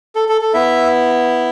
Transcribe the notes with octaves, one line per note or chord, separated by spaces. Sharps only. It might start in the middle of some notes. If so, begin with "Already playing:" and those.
A4
A4
A4
B3 E4 E5